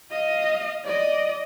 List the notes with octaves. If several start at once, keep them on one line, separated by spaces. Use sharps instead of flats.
D#5 F5
D5 D#5